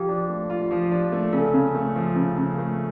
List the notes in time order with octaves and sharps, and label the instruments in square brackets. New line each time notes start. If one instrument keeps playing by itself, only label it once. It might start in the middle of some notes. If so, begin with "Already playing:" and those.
Already playing: [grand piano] F3 F4 [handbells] G4
[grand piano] D4
A3
F4
F3
D4
A3
[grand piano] C#3 [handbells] A4
[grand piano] C#3
A3
F3
C#3
C#3
A3